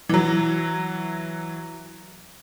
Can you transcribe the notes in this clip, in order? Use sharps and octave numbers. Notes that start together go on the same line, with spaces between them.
E3 F#3